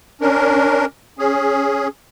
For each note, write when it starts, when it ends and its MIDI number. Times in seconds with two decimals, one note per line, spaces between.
0.21 0.86 61
0.21 0.86 62
0.21 0.86 70
1.19 1.88 61
1.19 1.88 68